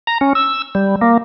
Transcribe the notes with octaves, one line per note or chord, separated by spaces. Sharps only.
A#5
C#4
E6
G3
A#3